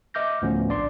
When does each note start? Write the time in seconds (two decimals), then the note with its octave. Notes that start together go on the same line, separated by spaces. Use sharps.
0.14 D#5 E5 D6 F6 G6 A#6
0.42 D2 A2 F3 B3 C#4
0.68 A#1 D4 D5 C6